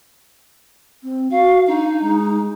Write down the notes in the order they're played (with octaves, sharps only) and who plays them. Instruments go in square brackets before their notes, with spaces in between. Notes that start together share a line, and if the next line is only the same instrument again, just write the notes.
[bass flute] C4
[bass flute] F#4 [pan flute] F5
[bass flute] D4 [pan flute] D#4
[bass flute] G#3